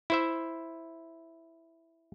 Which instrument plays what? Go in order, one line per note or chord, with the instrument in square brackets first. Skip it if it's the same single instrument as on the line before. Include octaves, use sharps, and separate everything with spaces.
[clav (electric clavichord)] E4 C5 E5